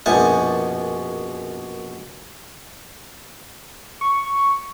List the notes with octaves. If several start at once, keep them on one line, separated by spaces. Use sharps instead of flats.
A#1 F#2 B2 G#5 A5
C#6